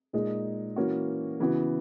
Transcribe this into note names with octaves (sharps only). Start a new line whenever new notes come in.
A#2 G#3 D#4
E3 A#3 C#4 F#4
C#3 E3 B3 F#4